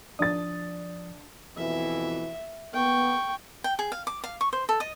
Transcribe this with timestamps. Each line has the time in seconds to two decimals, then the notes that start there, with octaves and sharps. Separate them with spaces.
0.19 F3 D4 D#6 A6
1.57 F2 B2 E3 E5
2.73 B3 G5 C#6
3.64 G5
3.79 G#4
3.92 F5
4.07 D6
4.24 F5
4.41 C#6
4.53 C5
4.69 A4
4.80 D#5